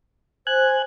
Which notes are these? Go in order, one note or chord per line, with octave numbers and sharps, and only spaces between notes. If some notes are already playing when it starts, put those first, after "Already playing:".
C5 G#5 F#6